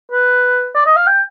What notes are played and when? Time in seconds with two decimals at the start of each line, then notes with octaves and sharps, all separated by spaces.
0.12 B4
0.75 D5
0.86 D#5
0.96 F5
1.07 G5